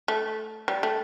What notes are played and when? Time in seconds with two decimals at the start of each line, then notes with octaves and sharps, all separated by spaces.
0.08 A3
0.68 G3
0.83 A3